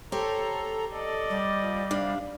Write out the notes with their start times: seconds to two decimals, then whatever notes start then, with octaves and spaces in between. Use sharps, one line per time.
0.12 G4 A4 C5 C#5 A#5
0.93 A4 D5 D#5
1.30 G3
1.60 F3
1.91 C3 D4 F5